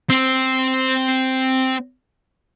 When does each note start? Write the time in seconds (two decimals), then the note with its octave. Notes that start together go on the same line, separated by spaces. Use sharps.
0.10 C4 C5